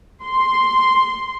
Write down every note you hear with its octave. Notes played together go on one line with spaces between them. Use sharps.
C6